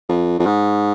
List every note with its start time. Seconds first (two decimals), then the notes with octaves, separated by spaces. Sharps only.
0.09 F2
0.39 F2
0.46 G#2